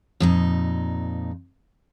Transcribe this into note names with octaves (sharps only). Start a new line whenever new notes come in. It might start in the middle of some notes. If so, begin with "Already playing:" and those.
F2 A#2 D#4